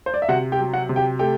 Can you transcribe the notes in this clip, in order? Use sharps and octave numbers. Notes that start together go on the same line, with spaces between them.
C5
D5
E5
C3 F#4 F#5
G4 G5
F#3
F#4 F#5
C3
G4 G5
A3 G4 G5